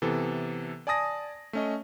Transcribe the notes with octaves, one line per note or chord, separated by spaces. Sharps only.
C3 E3 B3 A4
D5 G#5 A5 D#6 A#6
A3 C#4 D#5